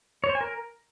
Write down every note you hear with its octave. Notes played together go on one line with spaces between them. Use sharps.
C#5
C5
G#5
A#4